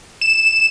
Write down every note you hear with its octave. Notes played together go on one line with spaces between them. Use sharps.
E7